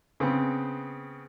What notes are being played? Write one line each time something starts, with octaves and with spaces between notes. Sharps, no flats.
C#3 B3 C4